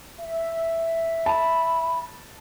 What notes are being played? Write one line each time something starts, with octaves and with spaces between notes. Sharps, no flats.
E5
A5 B5